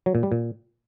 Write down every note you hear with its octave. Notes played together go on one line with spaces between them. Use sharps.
F#3
A#2
G3
A#2